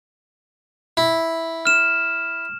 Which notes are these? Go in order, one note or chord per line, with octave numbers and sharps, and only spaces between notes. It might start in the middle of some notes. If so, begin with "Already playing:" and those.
E4
F6 E7